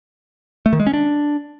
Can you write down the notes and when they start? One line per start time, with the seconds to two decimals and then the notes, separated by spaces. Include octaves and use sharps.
0.66 A3
0.73 D#3
0.80 G#3
0.87 C#4
0.94 D4